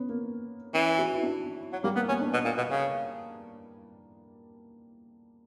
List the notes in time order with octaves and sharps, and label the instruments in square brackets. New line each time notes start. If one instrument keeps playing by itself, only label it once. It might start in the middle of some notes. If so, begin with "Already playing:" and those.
Already playing: [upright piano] B3 C#4
A#3
[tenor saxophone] E3 [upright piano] C#4
[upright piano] F#4
E4
D4
[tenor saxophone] F#3
[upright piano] G3 [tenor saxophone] A#3
[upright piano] A#3 [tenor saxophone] B3
[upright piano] B3 [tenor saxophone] C#4
[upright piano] D4
[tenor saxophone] B2
A#2
B2
C#3